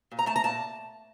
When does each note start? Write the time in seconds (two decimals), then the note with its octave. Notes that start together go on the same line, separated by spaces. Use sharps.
0.12 A#2
0.19 A#5
0.26 A3 A5
0.36 A#5
0.44 A#2 A5